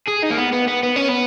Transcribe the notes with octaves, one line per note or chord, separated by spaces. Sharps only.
G#4
D#4
A#3
B3
B3
B3
B3
C#4
B3